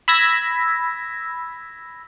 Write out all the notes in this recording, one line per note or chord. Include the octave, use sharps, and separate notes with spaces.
B5 E6 G#6 A#6 B6